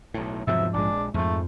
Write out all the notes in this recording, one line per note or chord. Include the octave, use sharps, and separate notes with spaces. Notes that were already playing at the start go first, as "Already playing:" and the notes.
B1 A2
E2 G#2 C3 F3 F#3 E5
A#1 G#3 D4
F2 G#2 F3 A3